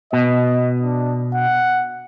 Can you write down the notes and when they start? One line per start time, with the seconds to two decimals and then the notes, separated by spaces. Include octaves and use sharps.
0.13 B2 D#5
0.82 D4
1.34 F#5